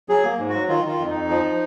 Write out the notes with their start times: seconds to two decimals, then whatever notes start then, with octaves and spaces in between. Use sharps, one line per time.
0.09 F#3 G#4
0.24 A#3
0.38 G#2
0.49 F#3 F#4
0.68 D#3 F4
0.84 D#3 F4
1.00 F2
1.10 F2 D#4
1.29 F3
1.44 F3